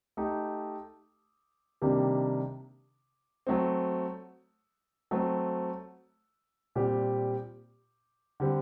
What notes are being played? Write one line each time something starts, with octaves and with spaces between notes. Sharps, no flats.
A3 D#4 G4
C3 D#3 G3 A#3 D4
F#3 A3 C4
F#3 A3 C4
A#2 G3 C4 G4
D3 G3 C4